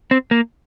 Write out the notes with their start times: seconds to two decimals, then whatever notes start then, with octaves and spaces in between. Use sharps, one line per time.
0.11 C4
0.31 A#3